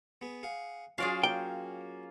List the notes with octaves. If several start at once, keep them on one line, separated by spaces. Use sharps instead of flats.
B3 G#4
G#4 F5 F#5
F#3 C#4 F4 F#4 G#4 D5 F5
A#3 G5